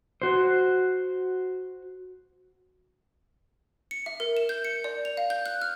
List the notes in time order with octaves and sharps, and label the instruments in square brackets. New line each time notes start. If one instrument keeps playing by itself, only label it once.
[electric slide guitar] F#4 C5
[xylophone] C#7
E5
A#4
E7
G6
C#7
D5
F7
F5
G6
F#6
F6